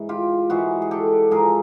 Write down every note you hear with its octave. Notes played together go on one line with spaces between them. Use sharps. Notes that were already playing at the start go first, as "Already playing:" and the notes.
Already playing: G#2 E3
F4 G4
G#2 E3 F#4 G#4
G#4
G4 A4
G#2 F3 G#4 A#4